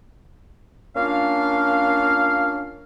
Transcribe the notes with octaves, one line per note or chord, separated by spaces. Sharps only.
A#3 C#4 D4 F4 F5